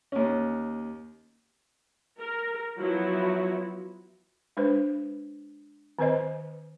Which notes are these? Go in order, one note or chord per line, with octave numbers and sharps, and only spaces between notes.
D#2 C#4
A#4
F3 F#3 B3 E4 F#4
G#3 D4 B4 C5
D#3 C4 B4 C5 D#5